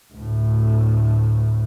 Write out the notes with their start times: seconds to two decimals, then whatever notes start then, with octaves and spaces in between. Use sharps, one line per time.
0.13 D2 A2